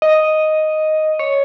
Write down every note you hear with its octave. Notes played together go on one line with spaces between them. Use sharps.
D#5
C#5